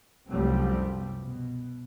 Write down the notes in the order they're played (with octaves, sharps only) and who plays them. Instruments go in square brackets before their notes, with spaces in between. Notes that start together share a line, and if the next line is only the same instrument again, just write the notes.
[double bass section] C2 F#2 F3 G3 A3 C4
B2